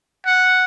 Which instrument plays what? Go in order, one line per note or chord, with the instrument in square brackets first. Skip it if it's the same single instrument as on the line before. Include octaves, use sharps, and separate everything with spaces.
[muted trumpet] F#5